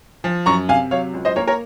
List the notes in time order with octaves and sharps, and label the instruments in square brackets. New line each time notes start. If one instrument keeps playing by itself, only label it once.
[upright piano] F3
F#2 A#5 C#6
C3 F5 G#5
F#3 C#5 F5
C#2
C5 D#5
A#3 A#4 C#5
A#4 C#5